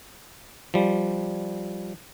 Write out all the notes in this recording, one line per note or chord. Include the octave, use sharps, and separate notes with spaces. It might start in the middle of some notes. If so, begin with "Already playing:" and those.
F3 G3